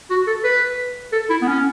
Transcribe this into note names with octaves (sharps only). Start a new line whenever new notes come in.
F#4
A4
B4
A4
E4
B3
C#4